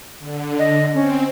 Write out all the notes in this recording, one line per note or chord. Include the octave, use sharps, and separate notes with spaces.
D3
D#5
C4 C#4